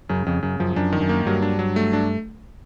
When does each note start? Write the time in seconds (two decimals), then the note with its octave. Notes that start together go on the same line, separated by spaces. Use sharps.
0.09 F#2 C#3
0.27 F2 C#3
0.43 F#2 C#3
0.60 F#2 F3
0.76 F#2 D4
0.92 D#3
1.01 F#2
1.09 A#3
1.26 G2 F#3
1.42 D4
1.59 F#3
1.76 A3
1.93 D4